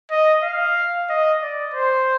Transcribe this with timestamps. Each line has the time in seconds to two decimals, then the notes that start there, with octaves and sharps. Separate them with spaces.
0.11 D#5
0.43 F5
1.09 D#5
1.42 D5
1.74 C5